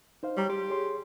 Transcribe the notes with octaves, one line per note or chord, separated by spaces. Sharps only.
D#4 C5 F5
G3 C#5 A#5
G4 C6
G#4 C#5 C6